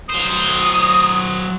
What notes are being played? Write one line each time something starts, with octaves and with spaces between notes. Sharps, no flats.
F#3 C5 D#6